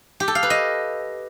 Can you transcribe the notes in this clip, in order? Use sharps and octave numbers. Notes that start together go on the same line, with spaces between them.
G4
A4
F5
B4
D#5